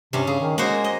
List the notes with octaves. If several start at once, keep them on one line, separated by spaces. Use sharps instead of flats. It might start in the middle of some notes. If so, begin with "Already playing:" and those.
G2 C3 C#4
C#3 G#4
D#3
G#3 A#3 F#4 C5
D#5